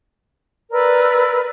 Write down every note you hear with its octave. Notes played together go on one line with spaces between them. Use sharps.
A#4 B4 D5 E6